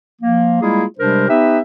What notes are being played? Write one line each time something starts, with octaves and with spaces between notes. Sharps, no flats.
F3 A#3
G3 G#3 A#3 E4 F4 G#4
C3 G3 G#3 D4 A#4 C5
B3 D#4 G4 B4 E5